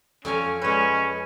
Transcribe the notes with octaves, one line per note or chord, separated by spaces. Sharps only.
F2 C#4 G#5 A#5
G#3 C#4 B4